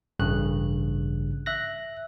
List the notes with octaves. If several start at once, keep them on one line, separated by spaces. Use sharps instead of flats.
A1 G2 C#3 F#6
E5 F#6 A#6